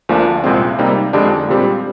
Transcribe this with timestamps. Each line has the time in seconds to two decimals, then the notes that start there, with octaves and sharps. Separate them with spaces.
0.09 D2 D3 F3 A#3 D4
0.44 C2 A#2 G#3 C4
0.79 C3 G3 A#3 D#4
1.13 F2 D3 G#3 D4 G4
1.48 A#2 G3 C4 G4